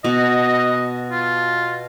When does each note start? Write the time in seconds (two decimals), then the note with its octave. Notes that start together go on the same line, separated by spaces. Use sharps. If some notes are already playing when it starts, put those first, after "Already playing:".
0.04 B2 D#5
1.12 F4